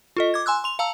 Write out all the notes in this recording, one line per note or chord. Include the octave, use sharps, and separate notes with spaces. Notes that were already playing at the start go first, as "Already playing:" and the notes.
F4 A4 D#5
D6 G#6
G#5 C6 E6 F#6
C6 F7
F5 A5 A#5 E6